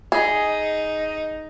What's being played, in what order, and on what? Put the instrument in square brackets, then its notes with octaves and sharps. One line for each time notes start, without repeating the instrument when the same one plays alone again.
[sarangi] D#4 [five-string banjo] G#4